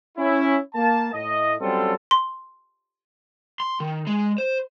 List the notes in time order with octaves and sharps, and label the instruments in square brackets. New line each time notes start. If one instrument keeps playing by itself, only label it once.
[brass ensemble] C#4 E4
A#3 A5
A2 D#5
F#3 G3 C4 C#4 F4 A4
[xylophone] C6
[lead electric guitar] C6
D#3
G#3
C5